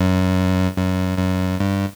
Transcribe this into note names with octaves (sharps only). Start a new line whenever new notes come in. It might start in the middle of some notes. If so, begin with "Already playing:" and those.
Already playing: F#2
F#2
F#2
G2